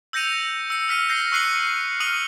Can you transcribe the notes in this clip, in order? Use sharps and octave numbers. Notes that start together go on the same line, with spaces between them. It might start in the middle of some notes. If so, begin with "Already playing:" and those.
E6 G6 A#6 C#7 D#7 F7
E6 C#7
E6 F6 B6 D#7
G6 A#6 C7
C#6 E6 F#6 C7 C#7 F#7
D#6 F6 D#7 F#7